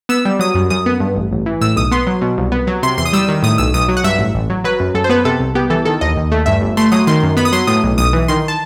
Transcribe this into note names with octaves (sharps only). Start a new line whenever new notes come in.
B3 E6
G3
F#3 D#6
F#2
F#2 D#6
B3
G2
A1
A1
E3
A2 E6
B1 D#6
B3 C6
F#3
B2
C2
B3
F#3
C3 C6
E2 C6
D#6
G3 E6
D#3
A2 D#6
B1 E6
B1 D#6
F#3
F#5
G2 E5
A1
A1
F#3
F#3 B4
F#2
F#2 A4
C5
B3 B4
C3 A4
C2
B3 G4
E3 A4
D#3 A4
D#2 D#5
D#2
A3
G2 E5
G1
A3 C6
F#3 D#6
D#3 C6
F#2
B3 B5
D#6
F#3 C6
A2 D#6
B1
B1 D#6
E3
D#3 C6
A5